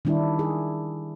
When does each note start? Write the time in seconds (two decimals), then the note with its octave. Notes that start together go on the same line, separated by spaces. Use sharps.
0.05 D#3 G3 D4 E4
0.39 G#4